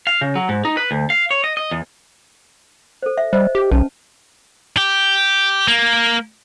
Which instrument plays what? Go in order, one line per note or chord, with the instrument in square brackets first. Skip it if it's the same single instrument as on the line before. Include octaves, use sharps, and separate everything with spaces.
[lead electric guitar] F5
C#3
F#3
G#2
D#4
B4
D2
F5
C#5
D#5
D#5
E2
[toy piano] A4 C5
E5
[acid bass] G3 [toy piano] C5 D#5
[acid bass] G4
[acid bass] B1 [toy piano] C#4 B4 A5
[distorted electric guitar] G4
A#3